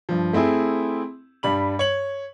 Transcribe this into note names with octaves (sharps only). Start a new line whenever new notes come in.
G2 F3
A3 C4 E4 G#4
G2 G3 B5 F#7
C#5 F#7